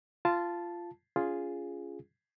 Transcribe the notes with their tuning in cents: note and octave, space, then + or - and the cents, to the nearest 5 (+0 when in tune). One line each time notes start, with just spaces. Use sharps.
F4 -15 A5 -5
C#4 +30 F4 +0 G#4 +0